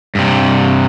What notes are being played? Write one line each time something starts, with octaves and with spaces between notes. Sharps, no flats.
G2 C3